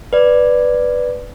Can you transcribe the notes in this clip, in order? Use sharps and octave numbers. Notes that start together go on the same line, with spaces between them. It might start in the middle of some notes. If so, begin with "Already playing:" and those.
B4 D5